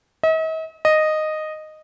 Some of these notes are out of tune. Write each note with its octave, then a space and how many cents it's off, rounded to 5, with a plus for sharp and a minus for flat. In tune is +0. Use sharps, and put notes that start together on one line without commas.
D#5 +45
D#5 -10